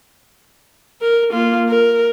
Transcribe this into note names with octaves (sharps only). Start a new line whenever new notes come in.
A#4
A#3 F4
A#4